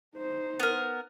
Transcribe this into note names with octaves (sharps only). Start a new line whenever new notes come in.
D#4 C5
B3 A#4